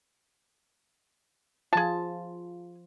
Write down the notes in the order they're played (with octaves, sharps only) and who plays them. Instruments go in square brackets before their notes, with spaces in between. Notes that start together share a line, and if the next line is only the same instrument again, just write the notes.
[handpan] F3 F4 [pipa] G#4 A5